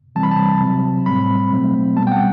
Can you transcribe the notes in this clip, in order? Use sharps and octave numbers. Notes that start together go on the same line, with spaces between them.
C3 E3 G3 C4 A5
B5
A5
C3 F#3 C4
A2 G3 C4 B5
B2 F#3 A3 C4
B2 G3 B3 A5
G5
F#5